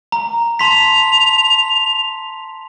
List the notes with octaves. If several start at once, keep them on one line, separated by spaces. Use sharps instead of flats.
A#5
A5 C6 B6 F7